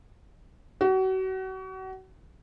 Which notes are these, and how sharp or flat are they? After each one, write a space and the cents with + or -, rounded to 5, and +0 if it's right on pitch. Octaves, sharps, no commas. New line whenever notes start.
F#4 +35